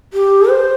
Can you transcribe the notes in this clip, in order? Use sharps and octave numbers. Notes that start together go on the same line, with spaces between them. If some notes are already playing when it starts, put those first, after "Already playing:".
G4
C5